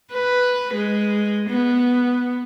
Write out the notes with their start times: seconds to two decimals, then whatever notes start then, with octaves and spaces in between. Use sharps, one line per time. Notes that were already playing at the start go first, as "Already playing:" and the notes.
0.12 B4
0.74 G#3
1.50 B3